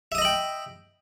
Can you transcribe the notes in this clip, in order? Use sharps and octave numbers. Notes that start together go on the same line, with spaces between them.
D#5 E5 G5 B5 D#6